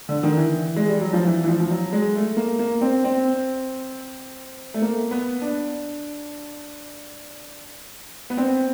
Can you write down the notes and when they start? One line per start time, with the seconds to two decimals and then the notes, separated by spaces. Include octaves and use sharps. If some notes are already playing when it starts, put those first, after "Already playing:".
0.09 D3
0.23 D#3
0.37 E3
0.76 G#3
0.88 G3
1.01 F#3
1.13 F3
1.26 E3
1.43 E3
1.48 F3
1.60 F3
1.70 F#3
1.93 G#3
2.16 A3
2.37 A#3
2.59 A#3
2.81 C4
3.04 C4
4.74 A3
4.82 A#3
5.11 B3
5.42 D4
8.30 B3
8.37 C4